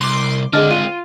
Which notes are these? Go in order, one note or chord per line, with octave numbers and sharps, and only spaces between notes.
C2 C6 D6
D3 G#3 C4 D4 G#4 D#5 F6
F4 D#7